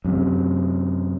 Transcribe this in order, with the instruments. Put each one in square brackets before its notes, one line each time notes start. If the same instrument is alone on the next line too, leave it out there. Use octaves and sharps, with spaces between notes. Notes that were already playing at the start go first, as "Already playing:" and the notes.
[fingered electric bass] F#2 C3